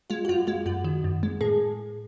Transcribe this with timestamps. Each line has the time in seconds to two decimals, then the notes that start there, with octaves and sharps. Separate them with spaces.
0.10 G#3 F4
0.25 F#4
0.29 F#2 F4
0.47 G#3 F4
0.66 F#2 F#4
0.85 D#3
1.04 F#2
1.23 G#3
1.41 A2 G#4